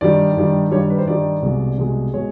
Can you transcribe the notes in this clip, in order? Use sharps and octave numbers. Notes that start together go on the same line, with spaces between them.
G2 D#3 G3 D5
G2 D#3 G3
G2 D#3 G3 C#5
B4
C5
G2 D#3 G3 D5
C2 B2 G#3
C2 B2 G#3
B2 G#3 C#5